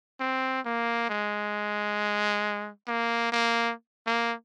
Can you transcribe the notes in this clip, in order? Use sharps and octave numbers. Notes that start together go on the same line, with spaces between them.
C4
A#3
G#3
A#3
A#3
A#3